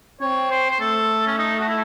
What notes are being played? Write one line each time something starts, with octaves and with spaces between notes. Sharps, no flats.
C4 C#5
C5
C5
A3 A4
C#4
D#4
F#4
E4